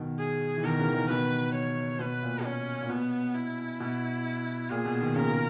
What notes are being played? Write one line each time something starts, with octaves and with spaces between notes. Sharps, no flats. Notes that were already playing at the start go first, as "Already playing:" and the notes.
Already playing: B2 D#3
G#4
E3
B2 D#3 A#4
C#3 E3
D#3
C#3 E3
B2 D#3 B4
C#5
B2 B4
A#2
C#4
A#2
B2 B3
E4
B2
A#2 G#4
B2
B2 D#3
A#2 C#3 A#4
C#3